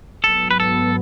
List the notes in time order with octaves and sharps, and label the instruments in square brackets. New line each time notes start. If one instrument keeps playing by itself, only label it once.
[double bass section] G#2 F#3 B3 [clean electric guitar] A4
[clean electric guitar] B4
A4